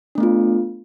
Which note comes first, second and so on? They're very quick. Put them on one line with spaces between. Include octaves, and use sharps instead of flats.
D4 A3 B3 F4